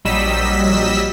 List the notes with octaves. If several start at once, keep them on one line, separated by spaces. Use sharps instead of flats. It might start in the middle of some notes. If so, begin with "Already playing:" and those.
A#1 F#3 G3 D#5 E6 B6